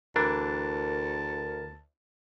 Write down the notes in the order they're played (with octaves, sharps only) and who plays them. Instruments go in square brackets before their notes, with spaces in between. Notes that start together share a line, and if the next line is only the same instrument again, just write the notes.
[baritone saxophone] D2 [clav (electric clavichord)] E3 D4 [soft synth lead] A#4 [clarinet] A5